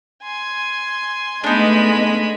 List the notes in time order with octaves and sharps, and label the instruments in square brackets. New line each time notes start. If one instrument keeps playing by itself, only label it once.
[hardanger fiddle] G#5 C6
[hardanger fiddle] G#3 B5 [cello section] A3 B3 D#5 [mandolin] D4 D#4